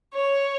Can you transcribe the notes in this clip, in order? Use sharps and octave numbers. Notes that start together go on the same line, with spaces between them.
C#5